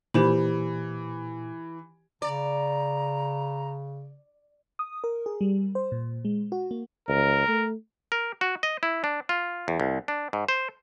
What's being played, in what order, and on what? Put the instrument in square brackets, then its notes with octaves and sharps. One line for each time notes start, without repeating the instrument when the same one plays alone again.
[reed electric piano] A#2 [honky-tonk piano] E3 [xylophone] G4 C5 B5
[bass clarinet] C#3 [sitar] D5 [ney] A#5
[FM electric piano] D#6
A#4
G#4
G3
C5
A#2
G#3
F#4
A#3
[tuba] C#2 [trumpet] A#4
[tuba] A3
[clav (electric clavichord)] A#4
F#4
D#5
E4
D4
F4
E2
C2
D4
G#2
C5